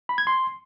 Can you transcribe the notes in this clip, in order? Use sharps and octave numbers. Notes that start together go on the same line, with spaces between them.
B5
G#6
C6